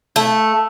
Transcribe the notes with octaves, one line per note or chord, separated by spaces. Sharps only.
A3